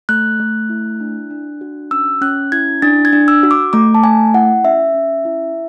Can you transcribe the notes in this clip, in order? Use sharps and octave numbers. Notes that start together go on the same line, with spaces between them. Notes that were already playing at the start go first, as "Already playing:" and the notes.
A3 F#6
A3
E4
D4
D4
F#4
C#4 E6
C#4 F#6
E4 G#6
D4 A6
G#6
D4
E6
F#4
D6
A3 D6
A5
A3 G#5
E4 F#5
C#4 E5
C#4
E4